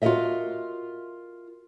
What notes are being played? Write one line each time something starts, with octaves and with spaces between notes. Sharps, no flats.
F4 F#4 A4 A#4 D#5 E5